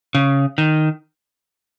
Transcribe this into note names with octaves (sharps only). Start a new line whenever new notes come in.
C#3
D#3